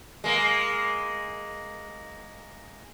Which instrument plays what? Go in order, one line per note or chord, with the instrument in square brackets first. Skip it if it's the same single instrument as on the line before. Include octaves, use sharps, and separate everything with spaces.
[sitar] G#3 A#3